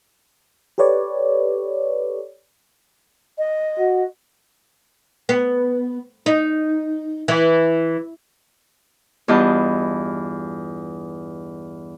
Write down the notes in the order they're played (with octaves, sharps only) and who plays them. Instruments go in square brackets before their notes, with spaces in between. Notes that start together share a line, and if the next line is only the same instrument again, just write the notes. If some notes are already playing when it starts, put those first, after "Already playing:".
[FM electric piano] G4 A4 B4 C#5 D5
[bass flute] D#5
[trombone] F#4
[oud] B3
D#4
E3
[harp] E2 G2 F4 D#5 A5 G6